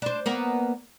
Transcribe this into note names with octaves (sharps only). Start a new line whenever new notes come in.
D4 C5
A#3 B3 A#4